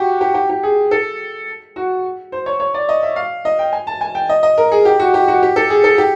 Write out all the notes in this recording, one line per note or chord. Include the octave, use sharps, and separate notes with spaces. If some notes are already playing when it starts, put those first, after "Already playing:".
Already playing: F#4 G4
G4
G4
G4
G#4
A4
F#4
C5
C#5
C#5
D5
D#5
E5
F5
D#5
G5
G#5
A5
G#5
G5
D#5
D#5
A#4
G#4
G4
F#4
G4
F#4
G4
A4
G#4
A4
G4